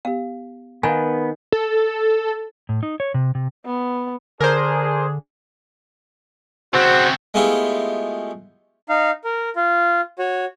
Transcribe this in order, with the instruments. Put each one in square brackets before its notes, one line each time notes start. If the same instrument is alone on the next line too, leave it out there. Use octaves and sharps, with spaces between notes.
[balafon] B3 G4 [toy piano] F5
[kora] D#3 [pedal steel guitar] B3 B4 [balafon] F5 A#5 [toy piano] G#5
[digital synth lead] A4
[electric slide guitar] A2
D#4
C#5
C3
C3
[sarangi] B3
[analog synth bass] D3 [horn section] D4 G#4 [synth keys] A#4 C5
[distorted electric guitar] C#3 C4 [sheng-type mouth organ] F#4 C5
[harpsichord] G#3 A3 B3 E4 F4 G4
[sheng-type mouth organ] D#4 F5
A#4
F4
F#4 C#5